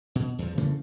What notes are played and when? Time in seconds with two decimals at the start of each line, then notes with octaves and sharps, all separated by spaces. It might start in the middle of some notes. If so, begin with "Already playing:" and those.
0.15 B2
0.39 E2 F3
0.57 C#3 E3 A3 A#3